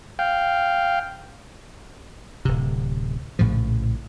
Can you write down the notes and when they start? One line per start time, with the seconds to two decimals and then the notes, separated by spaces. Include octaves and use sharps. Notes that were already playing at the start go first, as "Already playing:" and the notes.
0.19 F5 G5
2.45 D1 C3
3.39 A#1 A2 C#3 F3